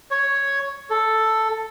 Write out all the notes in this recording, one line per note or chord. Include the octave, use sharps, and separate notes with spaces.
C#5
A4